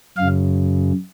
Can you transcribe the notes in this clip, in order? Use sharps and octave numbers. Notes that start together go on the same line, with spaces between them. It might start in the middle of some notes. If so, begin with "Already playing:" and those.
F#2 C#3 F5